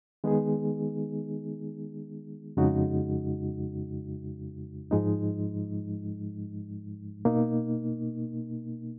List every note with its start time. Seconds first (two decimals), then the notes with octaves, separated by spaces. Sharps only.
0.24 D#3 G#3 B3 D#4 G#4
2.57 F2 C#3 G#3 D#4 F#4
4.91 G#2 F3 G#3 D#4
7.25 B2 A#3 D#4